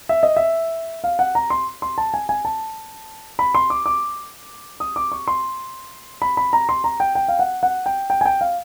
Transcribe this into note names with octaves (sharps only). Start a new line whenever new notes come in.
E5
D#5
E5
F5
F#5
A#5
C6
C6
A5
G#5
G#5
A5
B5
C6
D6
D6
D#6
D6
C#6
C6
B5
B5
A#5
C6
A#5
G5
G5
F5
F#5
F#5
G5
G5
G#5
G5
F5